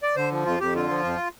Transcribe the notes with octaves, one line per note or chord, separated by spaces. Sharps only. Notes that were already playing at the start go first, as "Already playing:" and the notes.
D5
D3 C5
F3
F2 F4
F2 G4
D3 F4
F3
F2